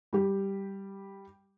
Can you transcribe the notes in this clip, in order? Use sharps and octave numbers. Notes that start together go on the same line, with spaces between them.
G3 G4